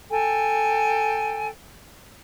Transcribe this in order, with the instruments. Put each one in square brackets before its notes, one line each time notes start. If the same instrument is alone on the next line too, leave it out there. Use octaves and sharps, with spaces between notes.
[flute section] A4 G5 G#5